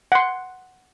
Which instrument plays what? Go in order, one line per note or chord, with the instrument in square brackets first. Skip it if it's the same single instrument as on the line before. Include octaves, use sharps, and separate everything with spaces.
[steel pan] F#5 C6